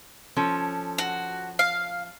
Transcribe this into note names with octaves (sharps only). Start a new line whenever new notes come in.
F3 C#4 A4
F#4
F5